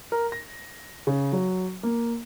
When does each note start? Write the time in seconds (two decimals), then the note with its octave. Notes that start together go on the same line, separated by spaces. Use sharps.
0.12 A#4
0.32 A#6
1.07 C#3
1.33 F#3
1.83 A#3